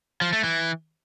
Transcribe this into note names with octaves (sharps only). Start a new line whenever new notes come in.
F3
A3
E3